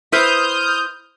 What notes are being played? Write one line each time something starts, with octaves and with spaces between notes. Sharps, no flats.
E4 B4 C5 D#6 F6 G6